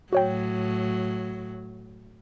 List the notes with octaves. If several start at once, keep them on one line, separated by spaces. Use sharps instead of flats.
A2 F#3 F#4 C#5 G5